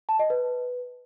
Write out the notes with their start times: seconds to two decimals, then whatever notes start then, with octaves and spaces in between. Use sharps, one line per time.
0.09 A5
0.19 D#5
0.30 B4